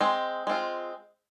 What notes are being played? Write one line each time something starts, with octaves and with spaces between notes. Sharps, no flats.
G#3 C4
G#3 C4 F4